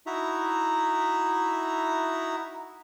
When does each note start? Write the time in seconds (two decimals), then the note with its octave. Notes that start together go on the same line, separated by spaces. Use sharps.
0.06 D#4 E4 F#4 E5 A#5